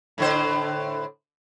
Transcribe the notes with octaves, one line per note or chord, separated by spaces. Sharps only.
A2 D3 C5